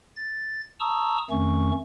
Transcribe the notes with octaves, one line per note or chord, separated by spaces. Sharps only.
A6
A5 A#5 C#6 D#6 E6
F2 D#3 A3 C#4 C#6